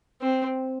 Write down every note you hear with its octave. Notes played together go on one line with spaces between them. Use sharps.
C4